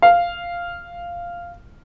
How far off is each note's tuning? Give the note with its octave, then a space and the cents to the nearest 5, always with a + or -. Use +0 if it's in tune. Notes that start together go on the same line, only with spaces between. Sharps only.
F5 -5